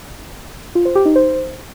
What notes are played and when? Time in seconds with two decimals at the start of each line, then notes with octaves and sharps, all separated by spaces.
0.75 F4
0.85 C5
0.95 G4
1.05 D#4
1.16 C5